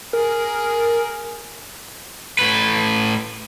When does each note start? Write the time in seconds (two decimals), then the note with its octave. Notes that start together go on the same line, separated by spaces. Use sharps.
0.13 G#4 A#4
2.39 A2 B4